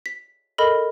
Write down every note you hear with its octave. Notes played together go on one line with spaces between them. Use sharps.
B6
A4 A#4 D#5 B5